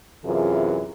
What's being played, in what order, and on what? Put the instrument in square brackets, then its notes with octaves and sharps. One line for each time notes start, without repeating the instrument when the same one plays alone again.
[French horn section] F#2 C3 E3 F4 G#4 B4